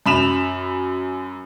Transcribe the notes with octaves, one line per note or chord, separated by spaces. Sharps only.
F#2 B5 E7 F7